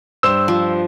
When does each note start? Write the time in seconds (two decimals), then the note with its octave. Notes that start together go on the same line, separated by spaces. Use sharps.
0.23 G2 C5 E6 E7
0.48 F3